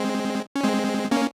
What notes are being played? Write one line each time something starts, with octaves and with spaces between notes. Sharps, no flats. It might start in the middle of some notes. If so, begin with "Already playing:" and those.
Already playing: G#3 C4
C#4
G#3 C4
A#3 C#4